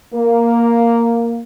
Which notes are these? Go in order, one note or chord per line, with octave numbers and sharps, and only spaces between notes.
A#3